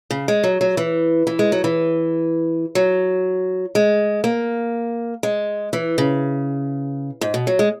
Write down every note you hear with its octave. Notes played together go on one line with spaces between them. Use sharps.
C#3
G#3
F#3
F#3
E3
E3
G#3
F#3
E3
F#3
G#3
A#3
G#3
E3
C#3
G#2
B2
F#3
G#3